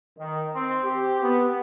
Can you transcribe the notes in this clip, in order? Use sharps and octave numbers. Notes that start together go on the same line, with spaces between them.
D#3
C4
G4
B3